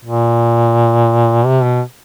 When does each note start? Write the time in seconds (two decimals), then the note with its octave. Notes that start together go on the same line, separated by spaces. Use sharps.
0.05 A#2
1.45 C3
1.63 B2